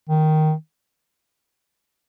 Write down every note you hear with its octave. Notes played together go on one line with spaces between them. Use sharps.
D#3